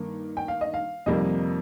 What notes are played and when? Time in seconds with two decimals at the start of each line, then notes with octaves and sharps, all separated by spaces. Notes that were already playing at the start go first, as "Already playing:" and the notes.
Already playing: G2 D#3 A#3
0.37 G5
0.48 F5
0.61 D#5
0.74 F5
1.06 F2 C3 D#3 G3 A#3 D#5